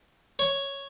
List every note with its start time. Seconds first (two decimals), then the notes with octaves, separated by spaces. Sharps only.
0.39 C#5